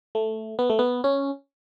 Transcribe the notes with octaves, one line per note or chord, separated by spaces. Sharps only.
A3
B3
A3
B3
C#4